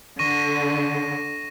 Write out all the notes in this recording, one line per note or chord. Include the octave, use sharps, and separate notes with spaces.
D3 C#6 A#6 D#7